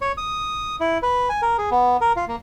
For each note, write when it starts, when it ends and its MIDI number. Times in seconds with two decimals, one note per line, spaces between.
0.02 0.12 73
0.17 0.76 87
0.80 0.98 64
1.03 1.29 71
1.29 1.41 80
1.42 1.57 70
1.58 1.70 68
1.71 1.97 59
2.01 2.12 70
2.16 2.25 65
2.28 2.36 58